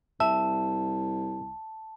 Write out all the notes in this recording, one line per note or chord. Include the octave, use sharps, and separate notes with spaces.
C2 E5 A5